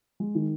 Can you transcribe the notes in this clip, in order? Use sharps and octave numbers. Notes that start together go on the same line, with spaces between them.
G#3
D#3